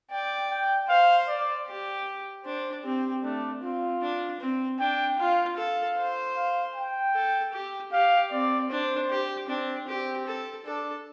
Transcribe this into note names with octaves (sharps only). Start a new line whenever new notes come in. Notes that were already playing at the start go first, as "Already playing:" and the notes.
D5 G5
G5
C5 F5
D5
G4
D4 C5
C4 G4
A3 D4
C4 F4
D4
C4
D4 G5
F4 F5
A4 F5
C5
F5
G5
A4
G4
G4 F5
C4 D5
D4 C5
G4
C4 D4
C4 G4
A4
D4 A4